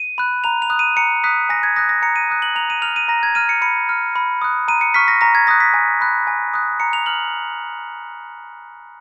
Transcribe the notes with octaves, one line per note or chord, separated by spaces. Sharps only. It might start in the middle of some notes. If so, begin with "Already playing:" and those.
Already playing: D#7
B5 F#6
A#5 F7
F7
D#6 F#6
D#7
A#5 C#7
D#6 F#6 B6
G#5 A#6
G#6
D#6 F#6 A#6
A#6
A#5 C#7
D#7
D#6 F#6
F#7
A#5 F7
D#7
F6 F7
D#7
A#5 A#6
G#6
F6 D#7
C#7
B5 C#7
F6
B5
D#6 F#6
A#5 D#7
C#7
C#6 F6 B6
A#6
A#5 A#6
G#6
D#6 F#6 A#6
B6
G#5
B5 F#6
G#5
D#6 F#6
A#5 C#7
F7
F6 F#7